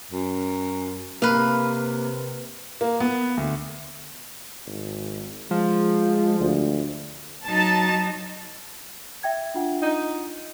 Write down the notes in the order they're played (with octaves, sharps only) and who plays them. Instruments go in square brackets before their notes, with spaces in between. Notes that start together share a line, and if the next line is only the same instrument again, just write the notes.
[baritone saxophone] F#2
[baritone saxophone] C3 [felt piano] A#3 [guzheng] B4 F5
[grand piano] A#3
B3
D2
[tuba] G#1
[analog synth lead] F3 [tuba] G#3
[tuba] D2
[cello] F#3 D#4 [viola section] A5
[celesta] E5 G5 G#6
D4 F4 F#5
[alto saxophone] D#4